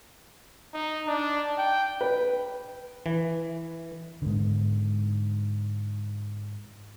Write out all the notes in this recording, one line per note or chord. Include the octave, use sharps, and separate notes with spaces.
D#4
D4
G5
B4
E3
G#2 D3